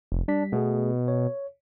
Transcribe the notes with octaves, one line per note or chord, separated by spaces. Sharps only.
F1
G3 D4 B6
B2 A3 B3 G#4
C#5